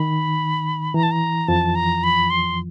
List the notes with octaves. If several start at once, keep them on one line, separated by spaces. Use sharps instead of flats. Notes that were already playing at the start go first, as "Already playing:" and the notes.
Already playing: D#3 B5
E3 A#5
A5
A#5
F2 F3 A5
A#5
B5
C6